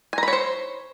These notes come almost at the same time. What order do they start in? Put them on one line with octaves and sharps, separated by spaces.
G#5 A#5 B5 C#5 C5